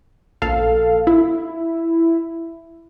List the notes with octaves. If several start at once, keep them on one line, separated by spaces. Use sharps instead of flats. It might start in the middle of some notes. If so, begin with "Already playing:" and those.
A#1 A4 F5
E4